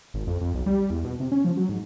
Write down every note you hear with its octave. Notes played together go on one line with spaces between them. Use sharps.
G#1
F2
F2
B1
G3
E2
B2
C3
C#4
F3
F#3
G#2